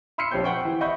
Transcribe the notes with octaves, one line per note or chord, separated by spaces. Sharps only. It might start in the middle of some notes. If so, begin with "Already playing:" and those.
B5 C6 E6 F6 C7 C#7
A#1 C4 G4 C#5 G6
C5 F#5 G5 C#6
E3
D#5 E5 F#5 B5 C#6 G6